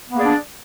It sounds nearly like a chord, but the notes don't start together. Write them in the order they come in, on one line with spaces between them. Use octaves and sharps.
B3 A#3 G#4 D5 D4